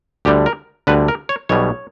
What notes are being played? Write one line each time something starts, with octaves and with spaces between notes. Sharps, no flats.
D2 D3 G3 G4
A#4
D2 D3 G3 B4
A#4
C#5
B1 B2 G3 C#5